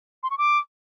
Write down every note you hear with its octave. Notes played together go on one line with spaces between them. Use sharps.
C6
C#6
D6